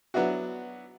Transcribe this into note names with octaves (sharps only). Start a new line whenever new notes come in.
F#3 B3 D4 E4 F#4